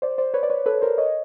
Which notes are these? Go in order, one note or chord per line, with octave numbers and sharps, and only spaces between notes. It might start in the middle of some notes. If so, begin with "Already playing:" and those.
C5 D5
C5 D5
B4 C#5
D5
B4 C#5
A4 B4
A#4 C5
C#5 D#5